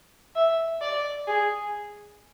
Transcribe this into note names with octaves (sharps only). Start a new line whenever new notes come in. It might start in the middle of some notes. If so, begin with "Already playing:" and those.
E5
D5
G#4